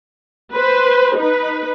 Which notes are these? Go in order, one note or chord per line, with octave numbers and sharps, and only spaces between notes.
B4 C5
D#4 B4